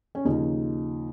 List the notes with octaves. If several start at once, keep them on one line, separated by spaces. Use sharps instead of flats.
C#4
D#2 C#3 F3 D#4